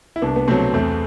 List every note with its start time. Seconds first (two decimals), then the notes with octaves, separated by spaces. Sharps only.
0.16 E4
0.22 C2 B3 D4
0.36 B3
0.47 B2 F#3 A3 C4
0.73 E2 A3 C4